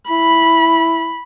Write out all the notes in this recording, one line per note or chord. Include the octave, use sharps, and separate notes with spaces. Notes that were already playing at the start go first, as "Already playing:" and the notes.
E4 B5